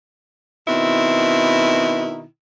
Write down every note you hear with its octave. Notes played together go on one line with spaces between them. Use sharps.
B2 D#3 C4 E4